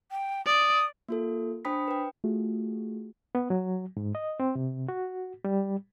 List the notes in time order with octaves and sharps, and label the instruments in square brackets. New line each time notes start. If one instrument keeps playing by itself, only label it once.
[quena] G5
[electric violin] D5 [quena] D#6
[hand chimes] A#3 F4 A4
D4 C5 G5 B5 D#6 B6
B4 G5
[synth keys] A3 F4 F#4 G#4
[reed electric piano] B3
F#3
G#2
D#5
C4
C3
F#4
G3